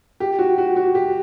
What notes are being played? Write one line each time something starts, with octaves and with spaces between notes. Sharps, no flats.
G4
F#4
F#4
F#4
G4